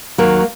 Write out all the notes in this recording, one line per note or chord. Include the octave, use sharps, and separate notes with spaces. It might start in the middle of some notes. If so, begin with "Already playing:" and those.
D#2 F#3 A#3